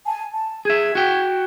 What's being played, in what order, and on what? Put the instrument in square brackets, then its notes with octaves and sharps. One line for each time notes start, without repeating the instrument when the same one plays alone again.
[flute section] G#5 A5
A5
[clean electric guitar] G#4 E5 [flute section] G#6
[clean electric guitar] F#4 G5